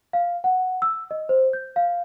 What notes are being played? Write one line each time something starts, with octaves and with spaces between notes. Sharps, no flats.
F5
F#5
E6
D#5
C5
G6
F5